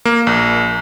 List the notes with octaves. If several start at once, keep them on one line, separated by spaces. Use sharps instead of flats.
A#3
A#1